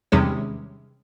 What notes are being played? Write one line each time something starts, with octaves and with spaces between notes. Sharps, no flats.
E2 C3 D#3 G3 G#3 C#4